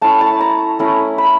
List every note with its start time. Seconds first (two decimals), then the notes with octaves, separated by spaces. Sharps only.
0.01 A3 C#4 E4 A5
0.21 A5
0.40 A#5
0.79 A3 C#4 E4
1.18 B5